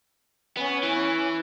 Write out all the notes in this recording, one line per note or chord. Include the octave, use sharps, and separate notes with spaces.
B3 C#4
E3